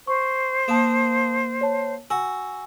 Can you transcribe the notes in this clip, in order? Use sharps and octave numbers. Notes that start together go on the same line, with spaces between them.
C5 C#6
A#3 A5 D#6 E7
C#5 A5
F#4 G#5 E6